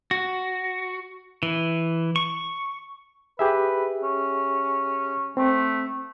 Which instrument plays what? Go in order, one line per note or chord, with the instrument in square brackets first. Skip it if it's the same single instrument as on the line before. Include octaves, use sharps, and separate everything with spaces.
[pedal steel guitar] F#4
E3
C#6
[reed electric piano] G4 G#4 E5 [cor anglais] B4
[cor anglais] C#4
[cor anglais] A3 [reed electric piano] C4